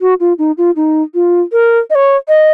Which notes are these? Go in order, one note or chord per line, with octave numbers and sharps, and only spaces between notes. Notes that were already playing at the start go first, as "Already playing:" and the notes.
F#4
F4
D#4
F4
D#4
F4
A#4
D#5
C#5
D#5